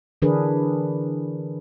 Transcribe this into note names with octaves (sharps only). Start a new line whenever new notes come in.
D3 E3 D4 G#4 A#4 B4